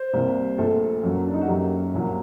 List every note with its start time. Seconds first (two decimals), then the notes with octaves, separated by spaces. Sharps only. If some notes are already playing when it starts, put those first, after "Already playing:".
Already playing: C5
0.13 C2 C3 G3 A#3
0.58 A#1 A#2 A3 A4
1.03 F#2 F#3 A#3
1.27 D4
1.34 D#4
1.41 F#4
1.48 F#2 F#3 A#3 G4
1.94 C2 A#2 F#3 A#3